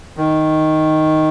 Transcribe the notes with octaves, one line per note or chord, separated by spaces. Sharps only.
D#3